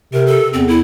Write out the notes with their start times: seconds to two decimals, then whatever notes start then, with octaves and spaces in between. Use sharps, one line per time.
0.13 C3 A#4
0.27 A4
0.53 E2 C4
0.68 E4